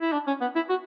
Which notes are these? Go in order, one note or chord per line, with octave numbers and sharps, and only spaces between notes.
E4
D4
C#4
B3
E4
F#4